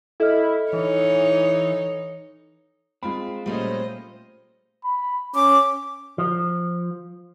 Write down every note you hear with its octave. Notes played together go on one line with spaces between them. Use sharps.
E4 A4 D#5 F6
E3 D#4 C#5
G#3 C4 F4 B5
A#2 G3 A3 C#4 C5 D#5
B5
C#4 D6
F3